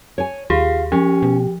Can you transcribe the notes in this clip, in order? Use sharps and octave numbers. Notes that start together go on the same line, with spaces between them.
C#5 G#5
D#2 F4 G4 G#4
F3 C#4 G4
B2